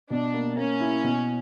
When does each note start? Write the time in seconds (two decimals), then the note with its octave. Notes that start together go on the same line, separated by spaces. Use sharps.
0.10 B2 D4
0.34 A#3
0.57 A#3 C#4
0.80 E4
1.04 B2